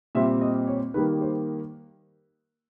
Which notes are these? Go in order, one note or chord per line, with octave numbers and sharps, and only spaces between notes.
A#2 G3 C4 E5
D#5
C#5
D#3 G3 A#3 B4
C5